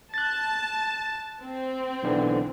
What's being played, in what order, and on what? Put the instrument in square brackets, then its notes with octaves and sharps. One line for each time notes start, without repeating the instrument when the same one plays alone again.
[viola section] A5 [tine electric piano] F#6 A6
[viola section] C4
[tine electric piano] B1 D3 E3